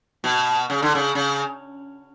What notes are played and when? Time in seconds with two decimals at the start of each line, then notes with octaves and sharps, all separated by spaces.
0.24 B2
0.70 C#3
0.82 D3
0.95 C#3
1.15 C#3